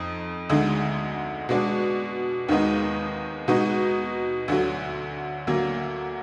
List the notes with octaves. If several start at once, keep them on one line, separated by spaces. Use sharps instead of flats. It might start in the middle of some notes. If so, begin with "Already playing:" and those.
Already playing: F2 D#4
D2 D3 G#3 D#4
B2 G#3 D4 F#4
D#2 D#3 G#3 B3 D#4
B2 G#3 D#4 F#4
D2 D3 F#3
D2 D3 F#3 A#3